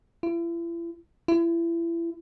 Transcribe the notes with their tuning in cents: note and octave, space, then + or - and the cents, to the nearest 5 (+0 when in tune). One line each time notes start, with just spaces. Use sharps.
E4 +40
E4 +30